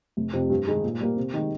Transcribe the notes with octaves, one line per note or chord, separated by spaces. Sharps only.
F1
F2 C3
G2
D#3 G#3 D#4 G#4
A#2
G3 A#3
C3
D#3 G#3